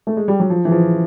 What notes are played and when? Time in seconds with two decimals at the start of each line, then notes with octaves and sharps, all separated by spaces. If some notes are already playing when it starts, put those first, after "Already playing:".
0.07 A3
0.17 G#3
0.28 G3
0.40 F#3
0.50 F3
0.65 E3
0.72 F3